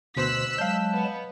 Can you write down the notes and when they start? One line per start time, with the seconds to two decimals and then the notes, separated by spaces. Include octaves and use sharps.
0.16 D2 B2 C5 E6 F#6 B6
0.58 F#3 G#3 F5 A5 G6
0.93 B3